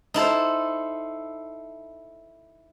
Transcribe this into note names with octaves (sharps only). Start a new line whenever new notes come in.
D#4 E4 A4 C5